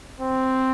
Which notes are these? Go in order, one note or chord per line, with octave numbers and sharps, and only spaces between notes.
C4